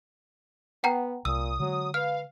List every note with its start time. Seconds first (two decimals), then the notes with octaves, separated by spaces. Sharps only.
0.84 B3 F#5 G5 A#5
1.25 C2 A#2 D#6 E6
1.60 D3 F#3 G#3
1.94 B4 F5 F6